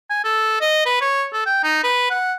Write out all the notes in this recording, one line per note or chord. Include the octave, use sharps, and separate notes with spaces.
G#5
A4
D#5
B4
C#5
A4
G5
D#4
B4
F#5